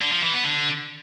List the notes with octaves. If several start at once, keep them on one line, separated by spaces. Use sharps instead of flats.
D3
F3
E3
B3
D3